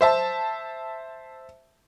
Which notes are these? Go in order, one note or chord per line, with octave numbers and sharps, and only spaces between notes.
C5 E5 A5